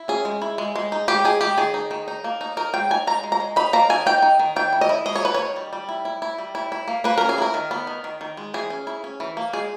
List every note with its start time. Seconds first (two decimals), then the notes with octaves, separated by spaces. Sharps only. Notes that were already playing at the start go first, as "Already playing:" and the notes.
Already playing: E4
0.08 C#4 G#4
0.25 G#3
0.42 E4
0.58 G#3
0.76 G#3
0.92 D#4
1.08 G#3 G4
1.24 D#4 G#4
1.41 G#3 G4
1.58 D#3 G#4
1.74 D#4
1.91 D#3
2.08 D#4
2.24 A#3
2.41 D#4
2.57 D#4 A#4
2.74 G#3 G5
2.90 D#4 G#5
3.07 G#3 A#5
3.23 G#3
3.32 A#5
3.40 G#3
3.56 D#4 B5
3.73 A#3 A#5
3.90 D#3 G#5
4.06 D#4 G5
4.22 D#4
4.39 D#3
4.56 D#3 G5
4.73 E4
4.81 D#5
4.89 E4
5.06 G#3 D#5
5.16 C#5
5.22 D#3 B4
5.34 D#3 C#5
5.56 G3
5.73 G3
5.89 E4
6.05 E4
6.22 E4
6.38 G3
6.55 E4
6.72 E4
6.88 A#3
7.04 A#3 B4
7.18 C#4 A#4
7.29 G#4
7.38 E4 A#4
7.54 D#3
7.71 B3
7.87 D#3
8.04 D#3
8.21 D#3
8.37 G#3
8.54 E3 G#4
8.70 C#4
8.87 E4
9.04 C#4
9.20 E3
9.37 A#3
9.53 G#3 G#4